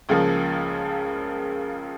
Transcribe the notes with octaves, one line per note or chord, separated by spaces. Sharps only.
C#2 C#3 F3 A#3